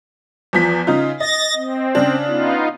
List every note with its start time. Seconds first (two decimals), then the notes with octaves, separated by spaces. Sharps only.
0.53 E2 F3 B6
0.87 C#3 D#4 F4
1.20 D#5 A6 A#6
1.55 C4
1.95 C#3 D4
2.27 B3 D#4 F4